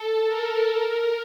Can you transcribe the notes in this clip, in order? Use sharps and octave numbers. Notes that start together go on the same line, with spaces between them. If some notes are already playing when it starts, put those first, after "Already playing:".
Already playing: A4
A#4
A#4